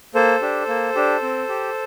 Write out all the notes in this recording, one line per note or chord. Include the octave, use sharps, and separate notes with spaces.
A#3 A4 C5
D4 G4
A#3
D4 G4
C4
G4